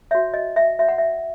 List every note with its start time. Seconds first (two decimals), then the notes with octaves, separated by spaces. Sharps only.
0.11 F#4 C#5 E5
0.34 D#5
0.56 E5
0.79 F#4 C#5 E5
0.89 F#5
0.98 E5